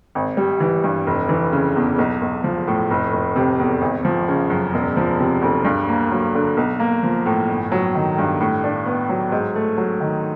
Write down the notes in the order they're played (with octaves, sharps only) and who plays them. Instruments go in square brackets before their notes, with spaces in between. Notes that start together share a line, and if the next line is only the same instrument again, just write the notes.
[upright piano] G#1
G3
E3
G2
F1
E3
C#3
E2
B1
B1
F3
A2
F1
F1
C3
E2
G#1
F3
C#3
F#2
E1
F3
C3
D2
G2
A#3
F#3
D3
B1
A#3
F3
A2
G1
F#3
D#3
G2
A2
D4
B3
F#3
G#2
A3
F#3
D#3